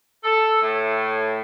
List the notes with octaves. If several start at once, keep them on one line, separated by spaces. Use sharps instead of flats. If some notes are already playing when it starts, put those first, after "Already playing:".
A4
A2